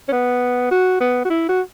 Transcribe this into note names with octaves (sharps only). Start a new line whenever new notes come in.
C#4
B3
F#4
B3
F#4
E4
F#4